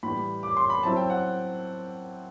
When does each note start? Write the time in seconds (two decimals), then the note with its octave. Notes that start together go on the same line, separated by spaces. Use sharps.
0.03 A2 E3 G3 B5
0.43 D6
0.57 C6
0.70 B5
0.83 F#3 C4 E4 A5
0.97 G5
1.10 F#5